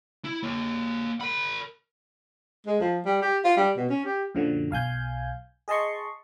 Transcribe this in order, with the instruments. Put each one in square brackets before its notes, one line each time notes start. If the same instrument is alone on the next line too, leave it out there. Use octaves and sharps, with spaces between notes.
[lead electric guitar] E4
A#3 C#5
A#4 B5
[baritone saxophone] G#3
F3
G3
G4
F4
G3
B2
C#4
G4
[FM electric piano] F#2 A#2 D3 F3 F#3
B1 F5 G#5 G6
G#4 D#5 A5 C6 C#6